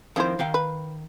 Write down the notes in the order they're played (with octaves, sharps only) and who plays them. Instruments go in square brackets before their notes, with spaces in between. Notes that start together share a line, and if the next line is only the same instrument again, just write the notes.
[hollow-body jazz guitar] F2 D#3 C4 [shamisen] F3 E4 C5
[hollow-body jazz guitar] D#3 F5 G5
[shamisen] B4